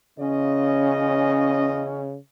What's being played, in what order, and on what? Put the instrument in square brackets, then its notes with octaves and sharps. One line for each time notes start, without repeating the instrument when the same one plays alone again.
[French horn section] E2 F4 D#5 [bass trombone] C#3 [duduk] C#4